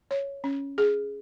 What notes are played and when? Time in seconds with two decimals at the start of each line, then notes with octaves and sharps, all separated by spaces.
0.11 C#5
0.44 C#4
0.78 G#4